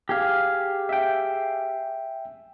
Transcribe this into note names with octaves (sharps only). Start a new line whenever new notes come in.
G4 G#4 F5
E5 G5